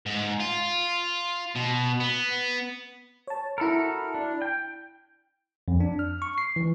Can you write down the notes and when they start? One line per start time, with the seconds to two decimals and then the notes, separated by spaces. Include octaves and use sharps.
0.06 G#2
0.40 F4
1.55 B2
2.00 B3
3.27 C#5 A5
3.58 E4 F#4 A4 A#4 B5 F6
4.14 D4
4.42 G5
5.68 F2
5.80 D4
5.99 F6
6.22 C#6
6.38 C7
6.56 E3